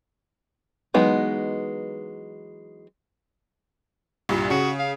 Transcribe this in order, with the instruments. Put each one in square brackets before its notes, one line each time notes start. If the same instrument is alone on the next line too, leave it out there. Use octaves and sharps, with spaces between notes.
[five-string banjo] E3 F#3 G#3 B3 D#4
[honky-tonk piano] C2 G2 A#2
[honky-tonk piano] C#3 [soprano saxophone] F#4
[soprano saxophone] F5